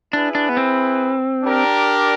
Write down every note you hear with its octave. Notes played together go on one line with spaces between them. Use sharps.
D4 E4 G#4 B4
D4
B3
C4
D4 G4 A#4 D5